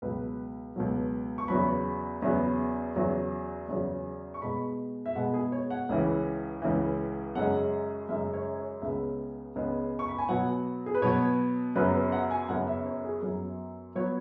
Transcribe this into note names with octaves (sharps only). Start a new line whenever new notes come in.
C#2 B2 F#3 B4
C#2 B2 F#3
C#6
E2 C#3 F#3 B3 B5
E2 C#3 F#3 B3
E2 C#3 F#3
E2 C#3 F#3
C#6
B2 G#3 B3 B5
E5
B2 G#3 B3 F#5
G#4
C#5
F#5
C#2 C#3 E3
C#2 C#3 E3
F#2 C#3 G#3 F#5
F#2 C#3 G#3 E5
C#5
C#5
C#2 C#3 G#3 B3 E5
C#2 C#3 G#3 B3
C#6
B5
G#5
B2 F#3 B3 F#5
G#4
B4
B2 F#3 B3 C#5
F#2 C#3 F#3 B3 B4
B4
F#5
G#5
F#2 C#3 F#3 B3 F#5
E5
C#5
G#4
F#2 F#3 B3
F#3 B3 C#5